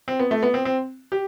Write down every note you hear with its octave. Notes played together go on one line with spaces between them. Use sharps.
C4
B3
A3
B3
C4
C4
G4